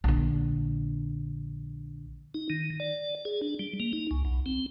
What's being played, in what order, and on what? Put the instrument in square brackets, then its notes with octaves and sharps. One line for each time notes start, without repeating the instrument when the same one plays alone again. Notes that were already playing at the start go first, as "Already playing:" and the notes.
[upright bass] A#1 D3
[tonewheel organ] D#4
D#3
D5
G#4
D4
G3
A#3
D#4
C#2
B1
C4